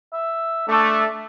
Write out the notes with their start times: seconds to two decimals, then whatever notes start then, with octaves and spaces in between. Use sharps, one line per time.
0.13 E5
0.68 A3 D4